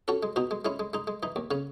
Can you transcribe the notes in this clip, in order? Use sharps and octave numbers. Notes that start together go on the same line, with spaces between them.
C#4 F#4 A4
G#3
B2 D#4 F#4
G#3
G#3 C#4 E4
G#3
G#3 D#4
G#3
E3 D#4
D#2
C#3 C#4